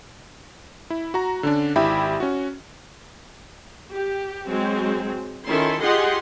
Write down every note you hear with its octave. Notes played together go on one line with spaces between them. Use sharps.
E4
F#4 A#5
D3 C#4 D4
G#1 E4 G4 E5 G5 B5
C#4 F#4
G4
F#3 G#3 C4
D#3 C#4 E4 F4 A4 C6
F4 G4 G#4 D#5 F#5 C6